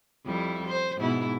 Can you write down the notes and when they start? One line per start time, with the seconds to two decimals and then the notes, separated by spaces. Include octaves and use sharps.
0.25 F2 G3 E4
0.67 C5
0.98 G#2 B2 E4